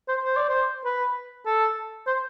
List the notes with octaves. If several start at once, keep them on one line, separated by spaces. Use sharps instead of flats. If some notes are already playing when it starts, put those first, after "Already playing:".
C5
C5
D5
C5
B4
A4
C5